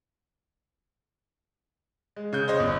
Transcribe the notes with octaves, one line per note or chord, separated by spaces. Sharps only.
G#3
C#3 G6
C5 C#5 D#5
G1